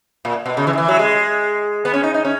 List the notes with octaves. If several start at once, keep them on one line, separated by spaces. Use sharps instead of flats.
A#2
B2
C#3
E3
D#3
E3
F#3
G#3
B3
C#4
D#4
D#4
C#4